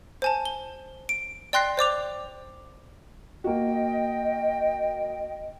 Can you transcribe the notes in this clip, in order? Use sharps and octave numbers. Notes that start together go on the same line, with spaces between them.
C5 G#5 A5
G7
D7
D5 G5 C6 F#6 A#6 C7
C5 D5 D6 F7
A#3 F#4 D#5 G5